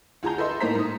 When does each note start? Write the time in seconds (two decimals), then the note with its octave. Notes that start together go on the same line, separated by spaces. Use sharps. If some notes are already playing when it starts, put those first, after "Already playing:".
0.23 D2 F4 G#4 A5 A#5 G6
0.38 A4 B4 D#5 E5 C6
0.60 A2 A#3 D#4 C5 A#5 B6
0.75 G#2 D#6